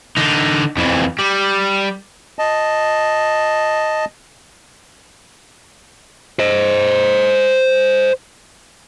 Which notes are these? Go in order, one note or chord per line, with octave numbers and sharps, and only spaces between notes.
D3 D#4
F2 E3
G3
D#5 A5
C5 D#5